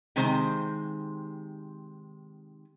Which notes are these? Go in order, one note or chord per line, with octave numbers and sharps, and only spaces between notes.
C3 D#3 G#3 C4 C5